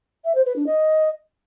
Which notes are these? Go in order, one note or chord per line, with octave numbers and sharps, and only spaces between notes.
E5
C5
B4
D4
D#5